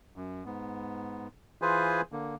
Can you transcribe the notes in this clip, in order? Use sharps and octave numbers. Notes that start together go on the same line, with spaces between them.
F#2
G#2 B3
E3 F4 G#4 B4 C5 G#5
D3 A#3